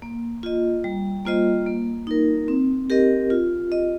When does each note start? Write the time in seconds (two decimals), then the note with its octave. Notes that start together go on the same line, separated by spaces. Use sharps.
0.02 A#3
0.43 F4 D#5
0.84 G3
1.25 A#3 F4 C5 D#5
1.67 A#3
2.07 D#4 A#4
2.48 C4
2.90 G4 A#4 D#5
3.30 F4
3.72 D#5